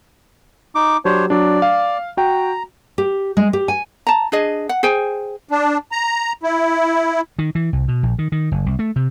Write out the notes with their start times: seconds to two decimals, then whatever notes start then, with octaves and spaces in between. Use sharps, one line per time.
0.75 D#4 D6
1.05 F#3 D4 G4 C5 C#5
1.30 F#3 D4 D5
1.62 F5
2.17 F#4 G5 A#5
2.98 G4
3.37 G#3
3.53 G4
3.68 G#5
4.07 A5 A#5
4.32 D4 G#4 D#5
4.69 F#5
4.83 G#4 C5 G5 G#5
5.49 D4
5.92 A#5
6.43 E4
7.39 D#3
7.55 E3
7.73 C2
7.88 B2
8.03 A#1
8.19 D#3
8.32 D#3
8.52 F#1
8.66 C2
8.79 A3
8.96 C3